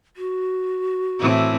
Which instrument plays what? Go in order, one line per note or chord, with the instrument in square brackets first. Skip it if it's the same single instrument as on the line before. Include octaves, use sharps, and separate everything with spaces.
[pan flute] F#4
[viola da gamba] A2 E3 C4